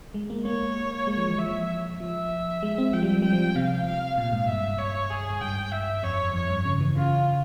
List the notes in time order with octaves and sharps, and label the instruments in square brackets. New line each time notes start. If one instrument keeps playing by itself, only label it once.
[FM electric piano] G#3
A#3
[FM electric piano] A#3 [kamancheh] C#5
[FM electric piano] G#3
F3
E3
[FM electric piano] F3 [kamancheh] E5
[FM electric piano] F3 [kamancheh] E5
[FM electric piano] G#3
C4
[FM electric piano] F3 [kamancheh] G5
[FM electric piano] G3
F3
[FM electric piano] G3 [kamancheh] G5
[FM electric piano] F3
[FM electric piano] C3 [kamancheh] F5
[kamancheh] F5
[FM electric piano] A#2 [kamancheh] F5
[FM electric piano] G#2
[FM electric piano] G2 [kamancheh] E5
[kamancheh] C#5
G#4
[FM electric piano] G#2
[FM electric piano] G2 [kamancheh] G5
[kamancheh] E5
[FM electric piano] F2 [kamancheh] C#5
[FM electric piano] F2 [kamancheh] C#5
[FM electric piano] G2
C#3
E3
[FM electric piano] C#3 [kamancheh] F4